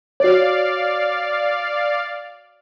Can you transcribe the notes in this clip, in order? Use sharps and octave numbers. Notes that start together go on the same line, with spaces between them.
F#4 C#5 D5 F5